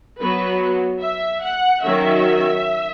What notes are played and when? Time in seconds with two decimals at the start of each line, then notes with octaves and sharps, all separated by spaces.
0.19 F#3 B3 B4
1.01 E5
1.42 F#5
1.83 D#3 F#3 C#4 E5